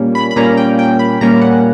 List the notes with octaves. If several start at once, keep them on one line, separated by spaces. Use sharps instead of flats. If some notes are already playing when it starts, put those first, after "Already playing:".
Already playing: A#2 G3 A#3 C#4
B5
B5
A#2 G3 A#3 C#4 A#5
G5
G5
B5
A#2 G3 A#3 C#4 A#5
F#5